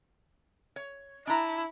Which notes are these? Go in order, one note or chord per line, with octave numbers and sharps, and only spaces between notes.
C#5
D4 E4 A#5